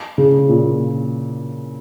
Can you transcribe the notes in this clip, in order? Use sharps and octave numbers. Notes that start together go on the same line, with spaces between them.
C#3
A#2